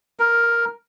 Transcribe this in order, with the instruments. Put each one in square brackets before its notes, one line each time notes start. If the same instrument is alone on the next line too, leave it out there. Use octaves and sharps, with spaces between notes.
[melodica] A#4